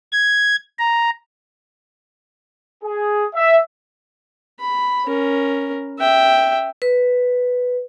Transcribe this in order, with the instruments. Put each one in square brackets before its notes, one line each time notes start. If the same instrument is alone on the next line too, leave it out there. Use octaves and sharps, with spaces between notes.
[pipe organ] G#6
A#5
[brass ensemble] G#4
E5
[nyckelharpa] B5
C#4 A#4
E5 G5
[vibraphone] B4